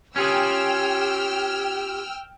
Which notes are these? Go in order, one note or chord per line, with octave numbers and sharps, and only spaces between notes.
C#4 F4 G4 G#4 G5 E6 F6